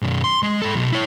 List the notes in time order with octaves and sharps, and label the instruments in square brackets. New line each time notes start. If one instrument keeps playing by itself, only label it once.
[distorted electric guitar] B1 F#2
C6
G#3
G#2 A4
B2 F#3
E4 C#5